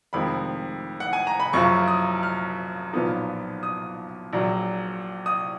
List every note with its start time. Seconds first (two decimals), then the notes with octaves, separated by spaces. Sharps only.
0.13 F1 F2 D#3 G#3 B5
1.00 F#5
1.13 G#5
1.27 A#5
1.40 B5
1.53 F#1 F#2 C#3 F3 C#6
1.88 D#6
2.23 F6
2.93 B1 A#2 F3 B3 D#4
3.63 D#6
4.33 A#1 A#2 F#3
5.26 D#6